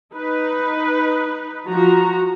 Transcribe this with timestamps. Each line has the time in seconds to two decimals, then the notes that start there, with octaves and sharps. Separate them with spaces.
0.15 D#4 B4
1.68 F3 F#4 A#5